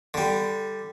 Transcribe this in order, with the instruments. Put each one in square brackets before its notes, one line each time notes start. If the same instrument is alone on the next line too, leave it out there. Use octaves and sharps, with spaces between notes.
[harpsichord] D3 G3